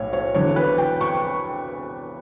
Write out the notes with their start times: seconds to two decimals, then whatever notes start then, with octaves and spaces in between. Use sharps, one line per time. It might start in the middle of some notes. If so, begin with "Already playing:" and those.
Already playing: B1 A2 C#5
0.13 C#5
0.34 E2 D3 F#3 C#5
0.56 B4
0.78 G5
1.01 C#6